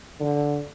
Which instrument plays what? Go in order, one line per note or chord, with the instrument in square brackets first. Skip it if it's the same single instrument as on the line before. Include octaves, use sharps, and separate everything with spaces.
[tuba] D3